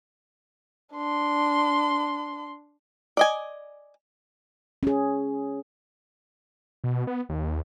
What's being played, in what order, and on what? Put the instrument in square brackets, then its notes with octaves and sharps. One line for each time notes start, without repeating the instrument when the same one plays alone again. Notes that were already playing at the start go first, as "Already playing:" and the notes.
[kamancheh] D4 C6
[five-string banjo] D5 D#5 G#5
[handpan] C#4 G#4
[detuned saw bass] B2
B3
D#2